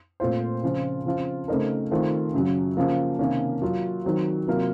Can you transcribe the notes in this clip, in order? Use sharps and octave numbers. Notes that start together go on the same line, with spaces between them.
A#2 A3 C4 F4 C5
C#3 F3 C4 F4
C#3 F3 C4 F4
C#3 A3 C4 D#4 A#4
D#3 A3 C4 F4
F#2 C#3 F#3
C#3 F3 A#3
C3 D#3 A#3 C#4
F#3 A#3 F4
D#3 F#3 C4
C3 F#3 A#3 F4 A#4